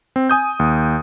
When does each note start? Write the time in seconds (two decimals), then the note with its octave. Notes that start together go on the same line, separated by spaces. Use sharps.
0.16 C4
0.29 G#5 D#6 G6
0.59 D#2